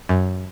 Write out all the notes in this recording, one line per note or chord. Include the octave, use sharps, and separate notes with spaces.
F#2